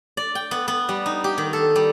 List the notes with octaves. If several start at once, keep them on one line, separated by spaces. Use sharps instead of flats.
D5
G5
B3
B3
G3
D#4
G4
D#3
A4
G3